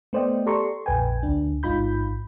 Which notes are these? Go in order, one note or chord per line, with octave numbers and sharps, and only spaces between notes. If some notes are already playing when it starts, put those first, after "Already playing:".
A3 B3 C5 D5 D#5 G5
G4 A4 D5 A#5 C6 C#6
A#1 F2 B4 G5 G#5
D2 D4
A1 G#2 D#4 F4 B5 G6